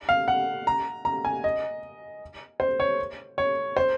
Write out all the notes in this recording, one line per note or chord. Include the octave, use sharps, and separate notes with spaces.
F5
F#5
A#5
A#5
G#5
D#5
C5
C#5
C#5
C5